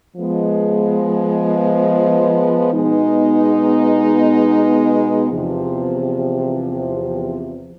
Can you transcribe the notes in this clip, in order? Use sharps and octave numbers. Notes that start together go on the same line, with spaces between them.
F3 G#3 B3
B2 G#3 B3 D#4
E2 C3 F3